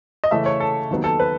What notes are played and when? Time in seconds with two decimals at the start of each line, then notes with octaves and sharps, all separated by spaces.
0.24 D#5
0.31 C#3 E3 A3 C#4 E5
0.46 C#5
0.60 A4
0.90 D#2 D#3 F#3 B3
1.04 A4
1.20 B4